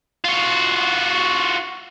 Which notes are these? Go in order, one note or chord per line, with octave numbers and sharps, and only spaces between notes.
F4 F#4